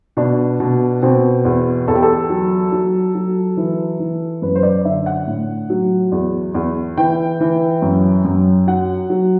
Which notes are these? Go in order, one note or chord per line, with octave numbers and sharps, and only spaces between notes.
B2 D4
B2
B2 C4
E2
E2 A4
G4
A4
F#3
F#3
F#3
E3
E3
F#2 B4
C5
D5
D3 E5
F#5
A2
F#3
E2
E2
E3 G5
E3
F#2
F#2
F#3 F#5
F#3